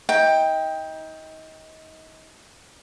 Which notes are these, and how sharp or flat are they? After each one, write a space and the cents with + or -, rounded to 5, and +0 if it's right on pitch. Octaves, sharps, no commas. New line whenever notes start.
D#4 +30 G5 +10